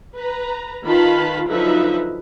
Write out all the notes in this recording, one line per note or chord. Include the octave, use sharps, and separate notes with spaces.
B4 A#5
D#3 F4 B4 F5 A5 B5
D3 F3 F#3 D#4 B4 E5